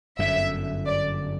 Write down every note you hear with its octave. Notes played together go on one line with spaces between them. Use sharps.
G1 F#2 D3 E5
D5